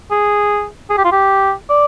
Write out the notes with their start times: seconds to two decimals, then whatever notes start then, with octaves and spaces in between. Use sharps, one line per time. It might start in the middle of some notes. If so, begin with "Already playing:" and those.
0.11 G#4
0.90 G#4
0.98 G4
1.05 F4
1.12 G4
1.70 D5